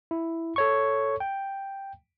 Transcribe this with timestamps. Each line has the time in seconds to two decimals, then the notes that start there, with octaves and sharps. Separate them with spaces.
0.11 E4
0.56 A4 C#5 C#6
1.20 G5